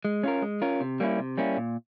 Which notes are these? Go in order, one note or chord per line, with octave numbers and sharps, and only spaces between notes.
G#3
C#4 F4 A#4
G#3
C#4 F4 A#4
C3
G3 A#3 C#4 E4
C3
G3 A#3 C#4 E4
A#2